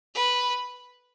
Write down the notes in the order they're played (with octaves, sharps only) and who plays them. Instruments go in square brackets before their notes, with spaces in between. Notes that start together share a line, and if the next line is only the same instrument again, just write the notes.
[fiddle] B4